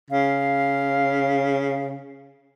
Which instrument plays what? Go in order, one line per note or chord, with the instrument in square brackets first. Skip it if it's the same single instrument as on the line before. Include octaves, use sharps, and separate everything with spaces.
[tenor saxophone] C#3 [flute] F5